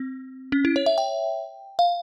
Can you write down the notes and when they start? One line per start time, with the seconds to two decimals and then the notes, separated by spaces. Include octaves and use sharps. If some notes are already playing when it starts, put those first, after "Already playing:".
Already playing: C4
0.52 C#4
0.65 E4
0.76 C#5
0.86 E5
0.98 G5
1.79 F5